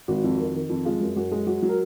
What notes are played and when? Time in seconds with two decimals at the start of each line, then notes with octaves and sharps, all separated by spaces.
0.08 G#1 F#4
0.24 F2
0.39 D#3
0.54 D#3
0.69 F2
0.85 G#3 F4
1.01 F#2
1.16 F#2 F#4
1.32 G#3
1.47 F#3 F#4
1.62 F#3
1.69 A#4